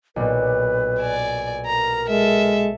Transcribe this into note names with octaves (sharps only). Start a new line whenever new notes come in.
B1 A#2 B4
D5 G#5 E7
A#4 A#5
G#3 A4 E5